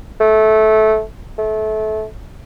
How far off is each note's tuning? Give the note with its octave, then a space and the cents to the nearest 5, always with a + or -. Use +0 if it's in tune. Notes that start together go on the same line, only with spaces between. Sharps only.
A3 -15
A3 -25